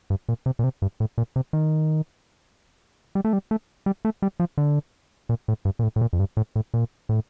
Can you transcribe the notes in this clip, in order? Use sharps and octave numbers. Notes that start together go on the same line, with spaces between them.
G2
A#2
C3
A#2
C3
G2
A2
A#2
C3
D#3
G3
A3
G3
A3
G3
A3
G3
F3
D3
A#2
A2
G2
A#2
A2
A2
A#2
F2
G2
A2
A2
A#2
A2